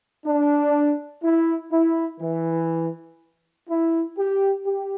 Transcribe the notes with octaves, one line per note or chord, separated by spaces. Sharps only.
D4
E4
E4
E3
E4
G4
G4